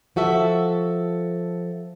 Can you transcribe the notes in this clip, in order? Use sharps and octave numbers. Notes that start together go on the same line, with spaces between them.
F3 F#4 A4 E5